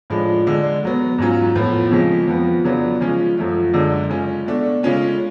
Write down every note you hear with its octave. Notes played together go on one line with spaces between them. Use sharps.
A2 F3 G#3 D4
D3 G#3 D4
B2 F#3 B3
G#2 F#3 C#4 F4
A2 F3 B3 F4
F2 C#3 F3 G#3
F2 F3 B3
C#3 F#3 B3 D4 F4
C#3 F3 G#3 C#4 F4
F#2 F3 A3 F4
F#2 D3 G#3 D4
C#3 G#3 C#4 F4
B2 A3 D4
C#3 G#3 C#4 F4